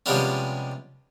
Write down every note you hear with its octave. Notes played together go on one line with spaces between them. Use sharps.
C3 F3 G3 G#3 B3 C#4